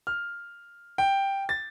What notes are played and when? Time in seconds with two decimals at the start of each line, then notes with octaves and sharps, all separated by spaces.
0.07 F6
0.98 G5
1.49 A6